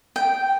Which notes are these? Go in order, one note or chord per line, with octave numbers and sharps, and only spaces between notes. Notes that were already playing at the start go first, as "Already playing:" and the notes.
G5